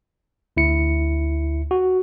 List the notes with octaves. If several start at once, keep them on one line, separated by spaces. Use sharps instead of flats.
D2 E4 C#7
F#4